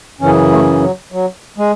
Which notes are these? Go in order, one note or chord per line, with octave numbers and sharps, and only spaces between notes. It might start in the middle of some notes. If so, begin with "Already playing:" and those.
F#2 C#3 E3 C#4
A3
F#3
F#3
G#3